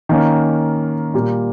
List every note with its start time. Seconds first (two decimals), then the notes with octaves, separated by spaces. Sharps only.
0.09 D#3 A#3 C#4
1.14 A#2 G3 A#3